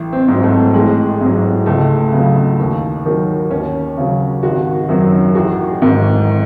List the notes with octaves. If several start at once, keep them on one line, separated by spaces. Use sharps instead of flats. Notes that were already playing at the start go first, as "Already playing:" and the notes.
Already playing: A1
C4
G#2 F#3
A3
A1 G#3
G#2 F#3
C#2 A3
C#3 F#3
D#2
D#3 F#3
D#2 C#4
C#3 F#3
G#1 F#4
F#2 D#3 F#3
A1 F#4
G#2 D#3